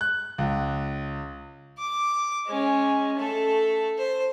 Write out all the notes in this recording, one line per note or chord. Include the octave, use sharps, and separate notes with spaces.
F#6
C#2
D6
G#3 C#4
A3 A4
C5